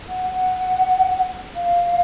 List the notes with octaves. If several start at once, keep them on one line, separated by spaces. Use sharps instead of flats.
F#5
F#5
F5